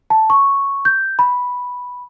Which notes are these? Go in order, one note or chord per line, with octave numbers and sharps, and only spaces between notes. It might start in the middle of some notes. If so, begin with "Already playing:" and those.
A5
C#6
G6
B5